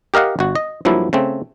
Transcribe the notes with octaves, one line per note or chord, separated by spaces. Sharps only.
G4 A#4 D#5 F5 F#5
G1 F#4
D#5
G2 F3 F#3 A#3 E4
C#3 A3 C4